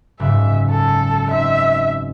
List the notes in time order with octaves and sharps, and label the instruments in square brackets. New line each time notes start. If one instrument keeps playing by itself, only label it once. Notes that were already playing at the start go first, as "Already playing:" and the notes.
[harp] F#1 G#2 [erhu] E5
[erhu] A4
[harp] C4 D#4 [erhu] E5